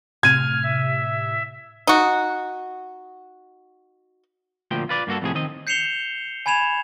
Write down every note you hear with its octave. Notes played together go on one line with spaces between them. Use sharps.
A2 C3 F6 G#6 D#7
E5
D#4 F#4
D2 A#2 F3 G5
F4 B4 D5
G2 A#3 F#4 A4
F2 A2 C3 G#4
D#3 C4 D#5
G6 C7 C#7 E7 F7 G7
G#5 B5 G#6 E7 F7